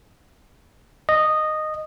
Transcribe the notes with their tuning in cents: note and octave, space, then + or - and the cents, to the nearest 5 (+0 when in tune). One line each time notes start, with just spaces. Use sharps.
D#5 -10